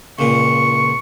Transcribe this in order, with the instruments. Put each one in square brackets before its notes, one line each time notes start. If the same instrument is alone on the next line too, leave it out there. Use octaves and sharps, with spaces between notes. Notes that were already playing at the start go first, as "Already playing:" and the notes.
[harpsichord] C#2 A#2 [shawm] C#6